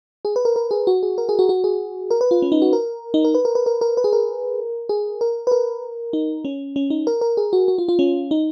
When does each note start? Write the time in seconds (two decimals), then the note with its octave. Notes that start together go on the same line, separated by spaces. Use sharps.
0.25 G#4
0.36 B4
0.45 A#4
0.56 A#4
0.71 G#4
0.87 F#4
1.03 G#4
1.18 A#4
1.29 G#4
1.39 F#4
1.49 F#4
1.64 G#4
2.10 A#4
2.21 B4
2.31 F4
2.42 C#4
2.52 D#4
2.62 F#4
2.73 A#4
3.14 D#4
3.24 A#4
3.34 B4
3.45 A#4
3.55 B4
3.66 A#4
3.81 A#4
3.97 B4
4.04 G#4
4.13 A#4
4.89 G#4
5.21 A#4
5.47 B4
5.51 A#4
6.13 D#4
6.45 C#4
6.76 C#4
6.90 D#4
7.07 A#4
7.21 A#4
7.37 G#4
7.53 F#4
7.68 F#4
7.78 F4
7.89 F4
7.99 C#4
8.31 D#4